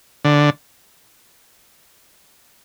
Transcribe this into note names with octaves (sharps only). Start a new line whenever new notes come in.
D3